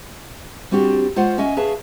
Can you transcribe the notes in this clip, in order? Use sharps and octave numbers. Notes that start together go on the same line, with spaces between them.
G3 C4 D4 F#4 G4
G#3 F4 C5 C#5 F#5
C#4 D#5 E5 G#5
G#4 B4 C#5 E5 F5 A5